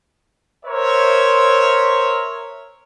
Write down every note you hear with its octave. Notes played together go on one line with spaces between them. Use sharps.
A#4 C5 C#5 E5